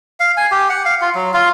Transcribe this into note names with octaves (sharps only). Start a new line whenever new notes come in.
F5
G#5
G4
F#5
F5
F4
F#3
F4